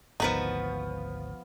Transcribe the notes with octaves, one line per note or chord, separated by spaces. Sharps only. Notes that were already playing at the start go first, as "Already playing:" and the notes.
G#1 D2 F3 B3 D#4 F#4 A#4